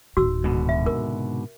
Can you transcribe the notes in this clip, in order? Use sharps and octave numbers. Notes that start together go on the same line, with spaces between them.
D1 D#3 F#4 E6
G#2 B2 D3
E5
C3 A#4